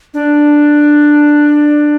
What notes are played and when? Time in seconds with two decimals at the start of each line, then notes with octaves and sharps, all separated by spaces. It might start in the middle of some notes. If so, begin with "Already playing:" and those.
0.14 D4